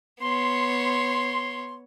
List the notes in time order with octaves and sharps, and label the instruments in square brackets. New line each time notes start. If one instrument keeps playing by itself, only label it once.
[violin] B3 C#5 [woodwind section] C6